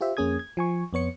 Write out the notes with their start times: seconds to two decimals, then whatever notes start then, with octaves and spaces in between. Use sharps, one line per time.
0.01 F4 G4 C5 E5
0.17 F2 A#3 C#4 G#4 D#6 G#6
0.39 G#6
0.57 F3 G#5 C#6
0.93 F2 B3 C#5 C#7